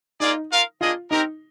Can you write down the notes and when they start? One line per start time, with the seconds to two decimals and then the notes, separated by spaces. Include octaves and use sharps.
0.20 A#3 D#4 F4 G#4 D5
0.51 F4 A#4 F5
0.81 A#3 D4 F4 G#4 D#5
1.11 C4 D#4 G4 A#4